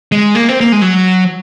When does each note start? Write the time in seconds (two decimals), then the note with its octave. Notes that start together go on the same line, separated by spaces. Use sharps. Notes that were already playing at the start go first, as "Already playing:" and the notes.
0.12 G#3
0.35 A#3
0.49 C4
0.61 A#3
0.72 G#3
0.82 F#3